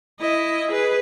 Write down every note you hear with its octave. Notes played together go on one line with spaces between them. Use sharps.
E4 D#5
G#4 B4